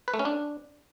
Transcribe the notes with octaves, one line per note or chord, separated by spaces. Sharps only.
B4
A3
C#4
D4